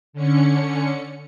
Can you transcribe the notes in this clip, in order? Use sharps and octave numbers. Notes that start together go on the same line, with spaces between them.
D3 C#4 C#7